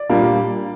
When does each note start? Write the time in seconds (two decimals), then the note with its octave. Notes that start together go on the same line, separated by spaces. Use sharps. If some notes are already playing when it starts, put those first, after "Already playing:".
Already playing: D5
0.09 A#2 G3 A#3 D4